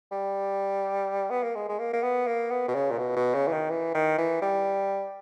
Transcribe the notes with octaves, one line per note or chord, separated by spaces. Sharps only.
G3
B3
A#3
G#3
G#3
A#3
A#3
B3
A#3
B3
B2
C#3
A#2
B2
B2
C#3
E3
D#3
E3
D#3
E3
G3